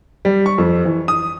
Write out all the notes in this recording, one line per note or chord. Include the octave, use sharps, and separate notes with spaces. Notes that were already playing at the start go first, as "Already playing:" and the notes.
G3
C#6
F2
E3
D#6